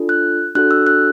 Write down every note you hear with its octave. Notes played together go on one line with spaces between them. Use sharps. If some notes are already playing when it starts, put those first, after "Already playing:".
Already playing: D4 F4 A4
F#6
D4 F#4 A4 F#6
E6
F#6